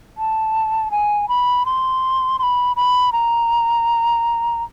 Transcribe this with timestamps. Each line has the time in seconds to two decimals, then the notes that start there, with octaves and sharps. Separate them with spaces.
0.18 A5
0.91 G#5
1.28 B5
1.65 C6
2.39 C6
2.43 B5
2.76 B5
3.12 A#5